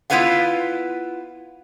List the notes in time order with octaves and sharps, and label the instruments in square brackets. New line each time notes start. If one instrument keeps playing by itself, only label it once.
[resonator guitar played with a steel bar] B3 E4 F4 B4 F5 F#5